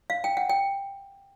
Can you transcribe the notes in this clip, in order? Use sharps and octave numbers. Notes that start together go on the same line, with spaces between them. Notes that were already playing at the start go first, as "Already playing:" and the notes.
F5
G5
F#5
G5